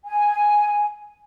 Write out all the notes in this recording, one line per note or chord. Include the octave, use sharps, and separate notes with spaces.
G#5